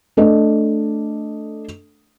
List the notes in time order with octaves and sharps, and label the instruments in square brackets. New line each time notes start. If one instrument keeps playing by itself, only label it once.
[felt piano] A3 D4 A4 D#5